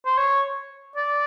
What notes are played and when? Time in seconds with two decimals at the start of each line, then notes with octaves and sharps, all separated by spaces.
0.06 C5
0.17 C#5
0.96 D5